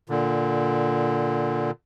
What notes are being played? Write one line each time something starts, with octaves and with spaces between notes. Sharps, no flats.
A#2 D3